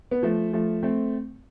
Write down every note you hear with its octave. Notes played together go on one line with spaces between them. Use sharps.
B3
F3 A3
F3 A3
A3 C4